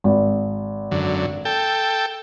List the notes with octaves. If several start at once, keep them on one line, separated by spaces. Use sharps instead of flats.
G#1
F#2 D3
A4 G5